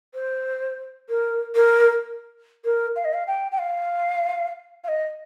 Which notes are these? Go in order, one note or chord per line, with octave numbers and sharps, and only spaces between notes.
C5
A#4
A#4
A#4
F5
D#5
F5
G5
G5
F5
F5
D#5